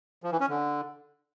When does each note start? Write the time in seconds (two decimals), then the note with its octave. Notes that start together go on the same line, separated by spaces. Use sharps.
0.23 F3
0.32 E3
0.41 C#4
0.49 D3